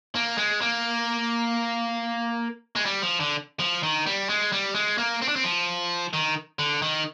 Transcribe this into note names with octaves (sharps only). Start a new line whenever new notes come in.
A#3
G#3
A#3
G#3
G3
F3
D3
F3
D#3
G3
G#3
G3
G#3
A#3
C4
D4
C4
F3
D#3
D3
D#3